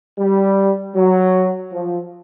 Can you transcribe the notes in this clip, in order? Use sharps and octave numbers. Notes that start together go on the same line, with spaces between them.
G3
F#3
F3